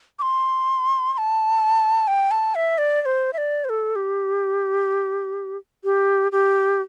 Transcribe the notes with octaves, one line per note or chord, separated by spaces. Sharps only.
D6
C6
C6
A5
G5
A5
E5
D5
D5
C5
E5
D5
C5
A4
G4
G4
G4